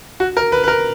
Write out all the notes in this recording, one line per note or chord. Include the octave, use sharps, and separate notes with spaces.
F#4
A#4
B4
B4
A#4